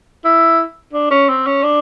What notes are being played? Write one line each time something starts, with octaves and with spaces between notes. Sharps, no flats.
E4
D4
C#4
C4
C#4
D4